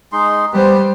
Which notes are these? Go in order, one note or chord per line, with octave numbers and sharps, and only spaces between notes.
G#3 D#4 C6
G3 B3 G4 B4 C5